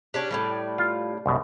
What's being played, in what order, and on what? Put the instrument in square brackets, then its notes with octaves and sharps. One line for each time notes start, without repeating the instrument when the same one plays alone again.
[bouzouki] C#4 D4 G4
A2 C#3 G3
[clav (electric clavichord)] F4
C2 F#2 B2